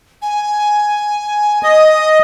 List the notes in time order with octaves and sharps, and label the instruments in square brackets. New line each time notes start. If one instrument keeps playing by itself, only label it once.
[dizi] G#5
[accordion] D#5 [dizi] D#6